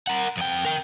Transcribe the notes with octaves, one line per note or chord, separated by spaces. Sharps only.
A#4 F#5
F2 G5
A#4 G5